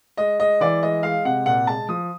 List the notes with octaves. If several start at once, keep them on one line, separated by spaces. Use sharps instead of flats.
G#3 D#5
G#3 D#5
E3 D5
G#3 D#5
G#3 F5
C3 F#5
A#2 F#5
G#3 A5
F3 D#6